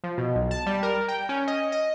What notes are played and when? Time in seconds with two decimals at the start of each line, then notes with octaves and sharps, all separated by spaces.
0.04 F3
0.18 B2
0.35 B1
0.51 A5
0.66 G3
0.83 A#4
1.08 G5
1.29 C#4
1.48 D#5
1.72 D#5